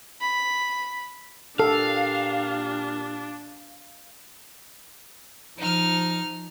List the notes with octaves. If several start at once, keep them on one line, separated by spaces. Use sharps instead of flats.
B5
A#2 D4 G4 A4 F5
F3 D#4 F6